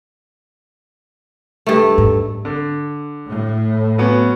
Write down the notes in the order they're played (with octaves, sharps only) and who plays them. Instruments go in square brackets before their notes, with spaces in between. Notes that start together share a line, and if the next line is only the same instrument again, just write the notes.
[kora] G2 A3
[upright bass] G#2
[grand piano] D3
[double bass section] A2
[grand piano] F#3 B3 C#4